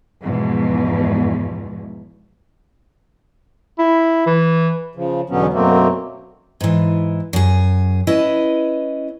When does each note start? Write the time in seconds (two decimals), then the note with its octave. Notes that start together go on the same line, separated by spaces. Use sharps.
0.21 E2 G#2 B2 F3
3.79 E4
4.26 E3
4.95 C#3 F3
5.30 E2 B2 D3 F#3 B3 C#4
5.53 F#2 B2 F#3 A3 A#3 C4
6.61 G#2 E3
7.33 F#2 G#4
8.07 C#4 E4 B4 D#5